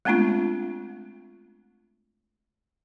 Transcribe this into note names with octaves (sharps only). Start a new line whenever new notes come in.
G#3 A3 B3 C4 D4 F4